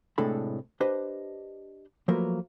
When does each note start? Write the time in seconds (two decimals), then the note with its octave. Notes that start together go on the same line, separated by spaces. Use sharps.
0.18 A2 C3 G#3 D4 A4 B5
0.80 D4 G4 B4 C5 D#5
2.08 F3 F#3 A3 A#3 A#4 B4